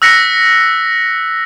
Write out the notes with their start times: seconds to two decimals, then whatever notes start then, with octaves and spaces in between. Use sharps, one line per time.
0.02 E6 F#6 A#6 B6 C#7